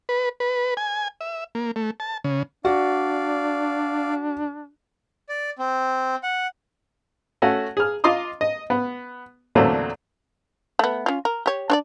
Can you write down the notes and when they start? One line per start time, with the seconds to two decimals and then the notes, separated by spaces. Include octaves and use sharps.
0.09 B4
0.40 B4
0.77 G#5
1.21 E5
1.55 A#3
1.76 A3
2.00 A5
2.24 C#3
2.65 D4 F#4 D5 F5
5.29 D5
5.59 C4
6.23 F#5
7.42 A3 C#4 F#4
7.77 G#4 F6
8.04 F4 D#5 C6 D6 D#6
8.41 D#5
8.70 B3
9.55 E2 A#2 D3 F#3 A3 C4
10.79 A3 B3
11.06 C#4 F4
11.25 A#4
11.46 G4 C#5
11.70 D4 C#5 D5